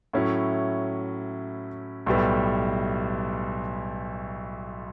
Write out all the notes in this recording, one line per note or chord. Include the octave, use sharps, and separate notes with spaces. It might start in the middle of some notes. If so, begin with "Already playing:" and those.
A2 F#3 C#4 E4
B1 A2 G3 B3